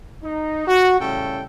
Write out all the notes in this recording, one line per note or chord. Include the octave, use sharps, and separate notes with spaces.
D#4
F#4
A2 C#3 G3 C#4 A4 G5